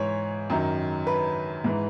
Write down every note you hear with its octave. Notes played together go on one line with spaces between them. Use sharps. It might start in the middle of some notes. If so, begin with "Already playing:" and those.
Already playing: G#2 E3 C#5
F#2 D#3 F#3
B4
G#2 E3